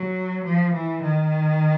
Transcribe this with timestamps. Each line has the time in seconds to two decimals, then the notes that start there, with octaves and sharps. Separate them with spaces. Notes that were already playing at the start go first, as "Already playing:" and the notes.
Already playing: F#3
0.44 F3
0.73 E3
1.03 D#3